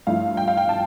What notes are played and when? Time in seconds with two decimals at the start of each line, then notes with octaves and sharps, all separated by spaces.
0.07 G2 F3 A3 E4 F5
0.37 G5
0.48 F5
0.57 G5
0.69 A5